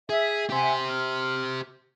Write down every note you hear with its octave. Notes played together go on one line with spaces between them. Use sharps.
G#4 E5
G4 C5 E5 F#5 G#5
F6